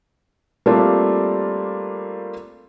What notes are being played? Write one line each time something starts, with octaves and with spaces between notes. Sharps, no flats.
G3 A3 A#3 C4 D4 F4